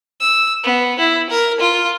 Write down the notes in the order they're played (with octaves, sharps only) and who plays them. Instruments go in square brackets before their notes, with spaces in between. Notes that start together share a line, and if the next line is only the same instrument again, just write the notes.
[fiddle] E6
B3
E4
A#4
F4